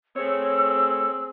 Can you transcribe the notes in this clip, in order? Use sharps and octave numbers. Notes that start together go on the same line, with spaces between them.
A3 C4 G#4 C#5 E6